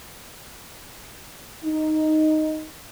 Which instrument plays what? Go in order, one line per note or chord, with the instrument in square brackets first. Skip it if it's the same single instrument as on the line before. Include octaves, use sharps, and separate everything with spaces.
[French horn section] D#4